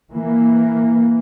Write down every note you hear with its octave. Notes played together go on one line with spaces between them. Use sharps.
E3 A#3